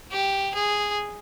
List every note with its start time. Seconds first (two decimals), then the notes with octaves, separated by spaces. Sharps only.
0.11 G4
0.54 G#4